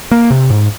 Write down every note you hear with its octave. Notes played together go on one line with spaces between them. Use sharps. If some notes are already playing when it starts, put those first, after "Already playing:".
A#3
C3
G#2